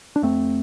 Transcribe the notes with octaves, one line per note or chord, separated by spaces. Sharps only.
D4
F2 A3 C4